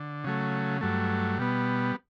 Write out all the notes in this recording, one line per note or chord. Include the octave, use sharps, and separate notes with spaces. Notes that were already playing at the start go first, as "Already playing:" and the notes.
Already playing: D3
C#3 F#3 A3
G2 F#3 A3
B2 G3 B3